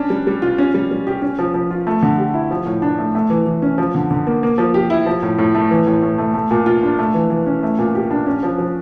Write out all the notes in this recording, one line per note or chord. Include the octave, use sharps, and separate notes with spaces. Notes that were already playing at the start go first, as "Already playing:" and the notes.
Already playing: C#4 D4
G3
G3
F4
C#4
G3
G3
G4
C#4
F3
F3
F4
A3
D3
G4
E4
F3
A2
D4
A3
A3
E3
E3
C#4
F3
D3
D3
A#3
A#3
F3
G4
E4
F3
A2
A2
A3
E3
A2
A2
A3
A3
A#2
F4
D4
A3
E3
E3
C#4
A3
A#2
G4
D4
C#4
F3
F3